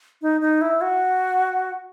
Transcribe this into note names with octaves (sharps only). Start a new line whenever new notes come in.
D#4
D#4
E4
F#4